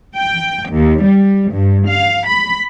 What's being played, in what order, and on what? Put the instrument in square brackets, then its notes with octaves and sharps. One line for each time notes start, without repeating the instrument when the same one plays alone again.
[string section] G5
D#2
G3
G2
F5
B5